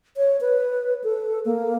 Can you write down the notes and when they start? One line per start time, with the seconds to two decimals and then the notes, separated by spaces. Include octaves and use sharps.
0.17 C#5
0.41 B4
1.04 A4
1.45 A#3